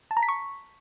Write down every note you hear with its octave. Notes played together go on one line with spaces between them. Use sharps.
A5
A#5
B6
C#6